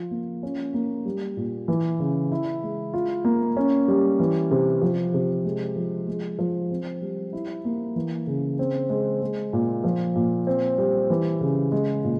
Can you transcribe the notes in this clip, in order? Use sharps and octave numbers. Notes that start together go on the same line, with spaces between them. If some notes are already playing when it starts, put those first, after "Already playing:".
Already playing: F3 F4
A#3
C#4
A#3
G3
A#2
E3
C#3
E4
G#3
F4
A#3
C#4
G3
E3
C3
F3
C3
G#3
F3
G#3
F3
C4
G3
E4
A#3
E3
C#3
C4
G#3
G#3
A#2
F3
A#2
C4
G3
E3
C#3
G#3
A#2